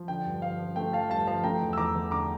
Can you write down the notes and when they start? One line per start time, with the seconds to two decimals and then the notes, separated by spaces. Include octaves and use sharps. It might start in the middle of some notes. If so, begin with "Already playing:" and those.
Already playing: F3
0.08 D3 G5
0.25 G2
0.42 F3 F5
0.59 F3
0.76 A3 G5
0.93 F3 F5 A5
1.10 G2 F5 A5
1.27 F3 F5 A5
1.43 A3 G5 A#5
1.61 E2
1.73 E6
1.77 E2 A#5 D6
1.95 E2
2.11 D3 A#5 D6